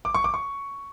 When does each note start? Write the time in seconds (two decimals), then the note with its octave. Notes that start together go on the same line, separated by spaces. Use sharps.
0.05 D6
0.15 C#6
0.24 D6
0.34 C#6